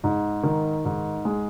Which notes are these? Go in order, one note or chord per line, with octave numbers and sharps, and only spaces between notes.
G#2
D#3
G#2
G#3